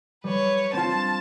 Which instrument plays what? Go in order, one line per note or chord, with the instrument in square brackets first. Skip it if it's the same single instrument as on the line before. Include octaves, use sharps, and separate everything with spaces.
[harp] G3 [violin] B4 C#5
[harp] C4 F4 [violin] A5